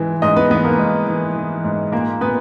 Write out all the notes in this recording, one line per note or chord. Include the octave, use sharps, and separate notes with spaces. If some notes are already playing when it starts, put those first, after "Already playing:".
Already playing: G#2 E3 E4
G#2 D#4 D#5
B3 B4
E3 B3 B4
A#3 A#4
G#2
E3
E3
G#2
A#2 A#3 A#4
A#2 B3 B4